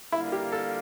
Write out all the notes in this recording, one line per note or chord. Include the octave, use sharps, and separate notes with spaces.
D3 G3 A#3 E4 F4
G4
A4